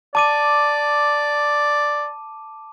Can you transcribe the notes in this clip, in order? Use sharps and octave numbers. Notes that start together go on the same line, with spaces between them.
D5 A5 D6 D#7